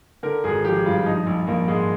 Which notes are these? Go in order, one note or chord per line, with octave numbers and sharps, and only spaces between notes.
D3 A#4
G#1 G#4
F3 G4
G2 F4
F3 D#4
A#1
A#1 A#3
G#2 G#3